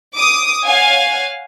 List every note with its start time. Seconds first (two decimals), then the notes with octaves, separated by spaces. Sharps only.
0.16 D6 D#6
0.65 C#5 F5 F#5 G#5